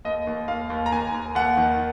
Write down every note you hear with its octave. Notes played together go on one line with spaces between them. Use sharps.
D#2 D#5
D#2
D#2 F5
D#2
A#5
D#2 G#5
D#2
D#2 F#5
D#3